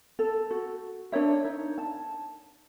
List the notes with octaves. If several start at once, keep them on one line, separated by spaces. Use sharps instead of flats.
A4
F#4
D4 A#4 C#5 E5
D#4 C#5
A5